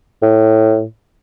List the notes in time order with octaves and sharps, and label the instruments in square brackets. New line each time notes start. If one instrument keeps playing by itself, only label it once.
[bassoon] A2